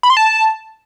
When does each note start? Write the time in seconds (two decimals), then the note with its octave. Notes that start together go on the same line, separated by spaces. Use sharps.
0.03 B5
0.10 C6
0.17 A5